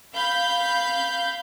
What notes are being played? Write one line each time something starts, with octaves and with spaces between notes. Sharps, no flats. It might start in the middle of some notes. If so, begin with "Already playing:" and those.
F5 B5 G6